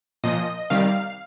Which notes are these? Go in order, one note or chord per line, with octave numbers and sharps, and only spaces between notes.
A#2 F3 D#5
C3 D#3 G3 F5